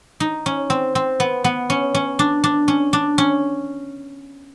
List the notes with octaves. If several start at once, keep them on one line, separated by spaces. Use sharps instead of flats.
D#4
C#4
C4
C4
B3
B3
C#4
C#4
D4
D4
C#4
D4
C#4